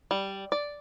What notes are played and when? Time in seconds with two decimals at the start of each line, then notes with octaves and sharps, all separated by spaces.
0.11 G3
0.52 D5